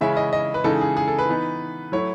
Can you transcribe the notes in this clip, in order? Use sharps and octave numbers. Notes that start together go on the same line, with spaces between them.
C#3 E3 G#3 C#4 E4 E5
D#5
D#5
B4
C#3 E3 G#3 D#4 A4
G#4
G#4
A4
B4
E3 B3 D#4
F#3 A3 E4 C#5